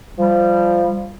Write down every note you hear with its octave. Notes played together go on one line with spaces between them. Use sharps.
F3 G3